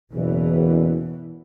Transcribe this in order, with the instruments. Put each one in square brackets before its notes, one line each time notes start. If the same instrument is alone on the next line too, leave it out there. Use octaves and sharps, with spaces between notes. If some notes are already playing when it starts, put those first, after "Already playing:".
[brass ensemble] F#1 E2 [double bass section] B2 E3